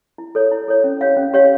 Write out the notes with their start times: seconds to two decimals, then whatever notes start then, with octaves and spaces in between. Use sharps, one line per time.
0.18 E4
0.35 A4 C#5
0.51 E4
0.68 A4 C#5
0.84 C#4
1.01 G4 C#5 F5
1.17 C#4
1.33 G4 C#5 F5